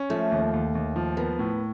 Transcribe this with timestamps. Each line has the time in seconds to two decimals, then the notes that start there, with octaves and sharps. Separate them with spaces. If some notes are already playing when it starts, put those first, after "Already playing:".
Already playing: C#4
0.10 F3 A3
0.31 D#2
0.53 D#2
0.75 D#2
0.96 F3
1.17 A#3 B3
1.39 A2